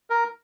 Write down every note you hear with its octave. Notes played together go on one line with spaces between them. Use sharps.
A#4